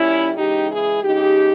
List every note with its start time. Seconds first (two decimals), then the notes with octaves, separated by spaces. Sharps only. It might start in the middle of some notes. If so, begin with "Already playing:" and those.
Already playing: A#2 G3 C#4 E4
0.37 C#3 E3 G#3 D#4 G4
0.70 E4 G#4
1.03 C#3 G#3 D#4 G4